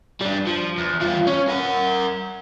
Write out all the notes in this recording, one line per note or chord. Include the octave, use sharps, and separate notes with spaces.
G3 D4
F3
E2
G3 F4
C#4
A#4 F#5